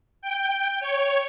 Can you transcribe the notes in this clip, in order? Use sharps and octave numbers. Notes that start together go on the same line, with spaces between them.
G5
C#5